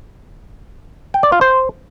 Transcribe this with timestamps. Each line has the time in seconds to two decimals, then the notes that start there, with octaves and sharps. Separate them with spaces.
1.14 G5
1.23 D5
1.32 F4
1.41 C5